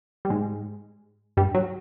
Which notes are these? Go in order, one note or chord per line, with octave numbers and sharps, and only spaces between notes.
G3
G#2 G#3
G2 G3
F#3